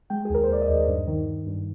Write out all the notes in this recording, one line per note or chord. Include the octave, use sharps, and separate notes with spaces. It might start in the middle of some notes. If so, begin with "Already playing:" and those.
G#3 G5
G#4
D#2 A#4
C5
D#2 D5
D#5
D#2
G2
D#3
D#3
G2